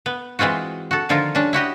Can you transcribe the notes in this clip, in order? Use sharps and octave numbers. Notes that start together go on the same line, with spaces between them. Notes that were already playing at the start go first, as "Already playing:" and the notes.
B3
E3 G#3 C4 F4 F#4
F#4 A4
D3 D#3 F3 F4 A4 A#4
G3 C#4 D4
E4 F#4 G4 D#5